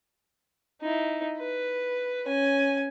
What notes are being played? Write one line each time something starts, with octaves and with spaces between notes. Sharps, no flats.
D#4 E4
B4
C#4 G#5